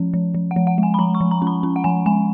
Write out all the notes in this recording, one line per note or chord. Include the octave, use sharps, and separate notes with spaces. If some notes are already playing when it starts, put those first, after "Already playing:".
Already playing: F3 C#4
F3
F3
F#5
F3
F#5
G#3
G#5
B5
F3 A#5
C#6
F3
A#5
C#4
B5
C#4
F#5
F3 G#5
G#3 G#5